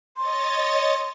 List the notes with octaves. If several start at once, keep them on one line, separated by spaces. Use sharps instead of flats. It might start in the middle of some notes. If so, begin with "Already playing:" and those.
C#5 D#5 C6 A6